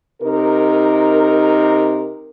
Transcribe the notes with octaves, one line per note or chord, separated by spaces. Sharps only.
C3 D#4 A#4